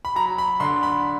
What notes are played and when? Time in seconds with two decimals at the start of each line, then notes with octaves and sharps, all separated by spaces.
0.05 B5
0.16 F#3 A#5
0.38 B5
0.60 D3 C6
0.83 B5